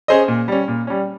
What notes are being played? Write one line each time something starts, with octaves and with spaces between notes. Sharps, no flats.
C#4 G#4 C5 D#5
A#2
G3 C#4
A#2
G3 C#4